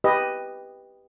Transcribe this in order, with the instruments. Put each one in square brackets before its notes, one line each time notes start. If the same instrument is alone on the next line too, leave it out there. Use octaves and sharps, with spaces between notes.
[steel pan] G4 B4 D#5